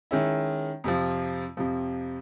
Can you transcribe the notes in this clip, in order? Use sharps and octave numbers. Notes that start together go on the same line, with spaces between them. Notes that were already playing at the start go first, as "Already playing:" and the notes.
D#3 G#3 C#4 E4
F2 C3 F3
F2 C3 F3